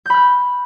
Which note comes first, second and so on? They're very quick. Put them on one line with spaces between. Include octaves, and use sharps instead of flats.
G6 B5 F6